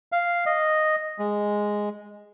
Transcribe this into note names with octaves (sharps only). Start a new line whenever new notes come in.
F5
D#5
G#3